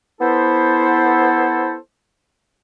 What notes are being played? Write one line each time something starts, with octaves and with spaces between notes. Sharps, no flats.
B3 E4 A4 C5